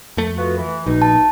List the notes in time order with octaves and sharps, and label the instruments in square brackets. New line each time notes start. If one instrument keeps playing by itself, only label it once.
[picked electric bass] F2 A3
[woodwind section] B3 F4 F#4
E3
[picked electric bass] A#1 [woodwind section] B2 D#4
[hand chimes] A5